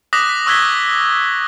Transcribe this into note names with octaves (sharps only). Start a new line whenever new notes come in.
D6 D#6 F#6 A#6 B6 F#7
B6
C#6 E6 F#6 G#6 B6 G7